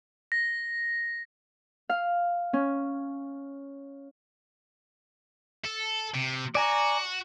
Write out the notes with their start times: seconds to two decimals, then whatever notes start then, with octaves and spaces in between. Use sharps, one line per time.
0.32 A#6
1.89 F5
2.53 C#4
5.65 A4
6.15 C3
6.55 F#4 D5 G#5 A#5